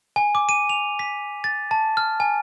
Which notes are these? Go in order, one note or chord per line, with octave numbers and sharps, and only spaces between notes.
G#5
D6
D#7
F7
B6
A6
A5
F6
G#5